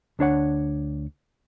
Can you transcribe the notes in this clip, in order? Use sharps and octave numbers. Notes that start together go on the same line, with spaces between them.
D2 D4 C#5 F#5